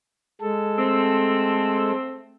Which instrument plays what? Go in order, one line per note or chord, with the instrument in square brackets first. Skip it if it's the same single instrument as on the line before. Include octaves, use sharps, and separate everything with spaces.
[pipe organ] G#3 A4
[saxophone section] A3 C4